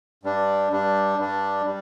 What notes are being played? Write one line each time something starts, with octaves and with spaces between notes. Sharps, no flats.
G2 G3 D4
G2 G3 D4
G2 G3 D4
G3